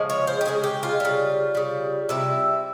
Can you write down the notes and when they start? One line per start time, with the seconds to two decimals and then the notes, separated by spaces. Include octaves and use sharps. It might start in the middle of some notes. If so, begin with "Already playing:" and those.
Already playing: C#3 F3 G#3
0.10 C#5
0.27 C5
0.41 G4
0.45 C#3 F3 G#3 G#4
0.64 G4
0.83 F4
1.00 C#3 G3
1.55 C#3 G3
2.09 C3 G3 E4